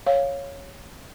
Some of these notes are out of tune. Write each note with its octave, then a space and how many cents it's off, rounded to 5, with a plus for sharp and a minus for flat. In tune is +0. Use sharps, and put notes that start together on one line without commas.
C#5 +0 F5 +0